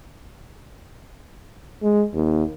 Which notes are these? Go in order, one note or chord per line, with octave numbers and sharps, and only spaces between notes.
G#3
D#2